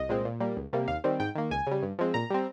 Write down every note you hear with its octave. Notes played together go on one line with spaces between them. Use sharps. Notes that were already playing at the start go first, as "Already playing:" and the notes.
Already playing: C2 D#5
A#2 G#3 C4
A#2
G3 A#3
C#2
C3 G3 A#3
D#2 F5
D#3 G3 C4
G#2 G5
D#3 A#3
C#2 G#5
C#3 G3
G2
F3 G#3 C4
A#2 A#5
G3 C4